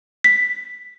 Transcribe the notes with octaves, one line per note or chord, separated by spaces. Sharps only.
B6